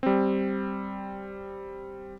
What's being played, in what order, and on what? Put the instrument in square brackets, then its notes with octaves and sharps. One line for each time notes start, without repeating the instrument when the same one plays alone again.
[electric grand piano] G3 C4